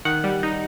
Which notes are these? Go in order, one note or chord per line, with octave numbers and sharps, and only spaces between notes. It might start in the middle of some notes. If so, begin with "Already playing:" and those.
D#3 F#5
G3
D#4